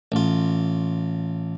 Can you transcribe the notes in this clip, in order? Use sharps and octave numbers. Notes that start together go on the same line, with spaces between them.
A1 F4